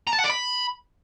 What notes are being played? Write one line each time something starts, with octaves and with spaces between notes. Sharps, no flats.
A#5
A5
F#5
D5
B5